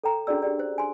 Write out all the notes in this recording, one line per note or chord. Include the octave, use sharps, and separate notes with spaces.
A4 C#5 G5 A#5
C#4 D4 F#4 G#4 D5 E6
G4 G#4 D5
C5
G#5 C6